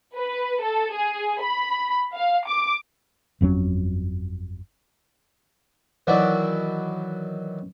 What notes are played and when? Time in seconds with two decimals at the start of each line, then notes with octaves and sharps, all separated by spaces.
0.16 B4
0.63 A4
0.93 G#4
1.43 B5
2.15 F5
2.47 D6
3.41 G1 F2 F#3 C#4
6.07 D#3 E3 F#3 E4 F#4 D5